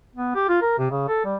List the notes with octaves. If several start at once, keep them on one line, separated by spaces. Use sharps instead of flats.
B3
G4
F4
A#4
C3
C#3
A4
G3